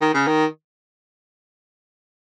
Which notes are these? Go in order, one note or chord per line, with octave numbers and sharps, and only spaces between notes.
D#3
C#3
D#3